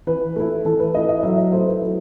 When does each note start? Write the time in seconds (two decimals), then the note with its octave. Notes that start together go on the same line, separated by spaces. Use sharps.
0.07 E3 B4
0.36 A3 E4
0.65 E3 A4
0.80 B4
0.94 A3 E4 D#5
1.09 D#5
1.23 F#3 E5
1.38 D#5
1.52 A3 E4 C5
1.67 B4
1.82 F#3